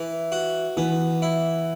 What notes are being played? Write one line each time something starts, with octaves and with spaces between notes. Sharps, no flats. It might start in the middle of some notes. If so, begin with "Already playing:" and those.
Already playing: E3
F#4
E3 B3
E4